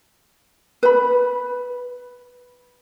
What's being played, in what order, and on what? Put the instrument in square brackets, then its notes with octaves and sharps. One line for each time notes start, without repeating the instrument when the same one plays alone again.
[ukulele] B4 B5